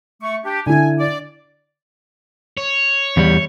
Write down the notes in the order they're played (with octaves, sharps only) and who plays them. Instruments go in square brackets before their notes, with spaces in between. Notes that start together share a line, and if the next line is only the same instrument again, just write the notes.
[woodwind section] A3 C#6
D4 G4
[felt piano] D3 E4 [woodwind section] G#5
[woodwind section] D5
[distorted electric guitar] C#5
[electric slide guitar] E2 G3